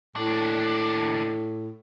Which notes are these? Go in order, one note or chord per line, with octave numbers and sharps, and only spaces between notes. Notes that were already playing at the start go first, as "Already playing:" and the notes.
D#2 A2 D4